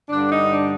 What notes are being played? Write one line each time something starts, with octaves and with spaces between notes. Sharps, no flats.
G2 D3 G3 D4
D#4
D4